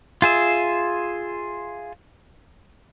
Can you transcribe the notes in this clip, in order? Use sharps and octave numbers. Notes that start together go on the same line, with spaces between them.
F4 G#4 E5